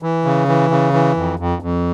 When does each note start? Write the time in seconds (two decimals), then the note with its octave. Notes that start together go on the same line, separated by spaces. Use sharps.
0.02 E3
0.25 C#3
0.48 E3
0.71 C#3
0.93 E3
1.17 F2
1.39 F2
1.62 F2